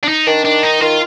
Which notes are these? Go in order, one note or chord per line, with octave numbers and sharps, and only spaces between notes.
D4
D#4
D#3 D4
D#3 D4
D#4
D#3 F4